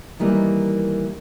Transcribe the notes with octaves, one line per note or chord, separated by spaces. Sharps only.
D#3 E3 G3 A#3